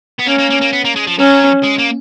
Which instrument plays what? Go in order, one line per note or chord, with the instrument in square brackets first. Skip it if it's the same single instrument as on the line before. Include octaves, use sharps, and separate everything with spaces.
[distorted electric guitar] B3
[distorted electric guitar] A#3 [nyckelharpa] C#4
[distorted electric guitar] A#3
A#3
A#3
B3
A#3
G#3
F3
[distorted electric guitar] F#3 [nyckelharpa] C#4
[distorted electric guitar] G#3
A#3